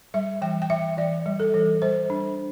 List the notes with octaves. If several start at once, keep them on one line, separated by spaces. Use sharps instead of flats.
G3 E5
E3 G5
G5
E3 E5
E3 D5
G3
A4
E3
G3 C5
D4